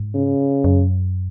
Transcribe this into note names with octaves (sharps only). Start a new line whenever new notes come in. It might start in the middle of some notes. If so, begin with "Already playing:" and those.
Already playing: G#2
C#3
F#2